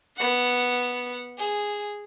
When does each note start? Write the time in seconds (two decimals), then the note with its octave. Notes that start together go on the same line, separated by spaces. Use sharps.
0.17 B3 F#5
1.38 G#4